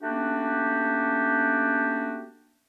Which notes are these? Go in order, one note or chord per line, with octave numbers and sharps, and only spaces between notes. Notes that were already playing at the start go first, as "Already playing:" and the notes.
A3 A#3 C#4 D4 F#4 G4